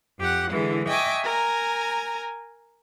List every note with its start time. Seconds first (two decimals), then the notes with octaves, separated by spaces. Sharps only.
0.18 F2 G4 F#5
0.51 D3 E3 G#3 E4
0.88 D#5 E5 G5 G#5 C#6 D6
1.23 A#4 G#5 A#5